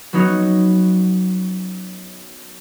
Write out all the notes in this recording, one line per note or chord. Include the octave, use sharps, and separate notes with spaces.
F#3 B3 C#4 D#4 F#4